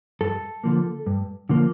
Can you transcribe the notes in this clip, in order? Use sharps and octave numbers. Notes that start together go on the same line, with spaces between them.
G2 A4
D3 F3 A#3
G2
D3 F3 A#3